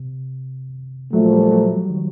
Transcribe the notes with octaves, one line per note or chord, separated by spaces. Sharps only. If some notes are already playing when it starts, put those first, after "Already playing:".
Already playing: C3
A#2 F3 F#3 A3
G3
F#3
F3
D#3